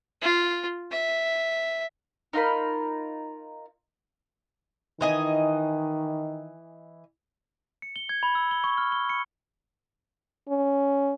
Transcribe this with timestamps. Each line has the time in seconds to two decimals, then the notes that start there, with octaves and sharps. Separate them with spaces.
0.22 F4
0.92 E5
2.33 D#4 F4 A#4 B5
5.01 D#3 E3 D#5 G#5
7.82 C#7
7.96 G7
8.09 G#6
8.23 B5
8.35 E6
8.51 G7
8.64 C#6
8.78 F6
8.92 G7
9.09 C#7
10.49 C#4